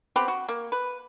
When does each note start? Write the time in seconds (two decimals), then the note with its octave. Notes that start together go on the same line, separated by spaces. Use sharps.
0.16 B3 C4 G4 B5
0.28 F#4
0.48 A#3
0.72 B4